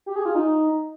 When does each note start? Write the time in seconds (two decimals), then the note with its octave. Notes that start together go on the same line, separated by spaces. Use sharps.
0.06 G4
0.16 G#4
0.25 F4
0.35 D#4